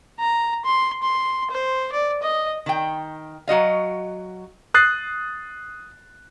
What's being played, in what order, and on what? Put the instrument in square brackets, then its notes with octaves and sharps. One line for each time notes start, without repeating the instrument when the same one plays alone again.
[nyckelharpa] A#5
C6
C6
C5
D5
D#5
[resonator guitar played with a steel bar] D#3 G5
F#3 F#4 D#5 F5
[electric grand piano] D#6 F#6 A6 C7